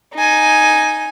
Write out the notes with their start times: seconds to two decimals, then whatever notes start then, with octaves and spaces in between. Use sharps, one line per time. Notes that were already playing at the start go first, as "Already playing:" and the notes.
0.15 D#4 G#5